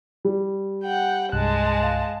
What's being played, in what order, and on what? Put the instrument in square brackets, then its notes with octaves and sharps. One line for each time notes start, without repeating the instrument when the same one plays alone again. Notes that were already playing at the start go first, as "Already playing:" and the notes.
[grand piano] G3
[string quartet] F#5 G5
[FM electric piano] C2 G2 F#6 [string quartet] G#3 A5
[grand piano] F5